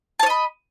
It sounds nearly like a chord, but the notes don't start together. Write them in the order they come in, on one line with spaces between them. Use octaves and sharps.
A5 C#5 D#5 B5